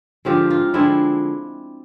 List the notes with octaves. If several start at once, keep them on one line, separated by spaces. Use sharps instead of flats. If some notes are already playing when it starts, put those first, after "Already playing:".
D3 F3 G#3 C4 F4 G4
D#4 F4
D3 F3 G#3 C4 D4 E4